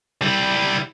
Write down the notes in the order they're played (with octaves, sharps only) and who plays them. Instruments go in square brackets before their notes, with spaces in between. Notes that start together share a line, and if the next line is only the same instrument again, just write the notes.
[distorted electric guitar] G3 E4